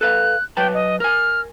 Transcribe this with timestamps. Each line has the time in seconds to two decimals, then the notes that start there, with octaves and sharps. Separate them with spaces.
0.01 A4 B4 F5 F#6
0.57 F#3 B4 G5 A5
0.74 D#5
1.00 A#4 G#5 F6